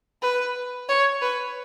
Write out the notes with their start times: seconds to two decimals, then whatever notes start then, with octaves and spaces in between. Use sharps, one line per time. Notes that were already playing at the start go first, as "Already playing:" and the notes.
0.22 B4
0.89 C#5
1.22 B4